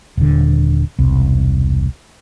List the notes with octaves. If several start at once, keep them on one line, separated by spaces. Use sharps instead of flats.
D#1 D3
E1 C2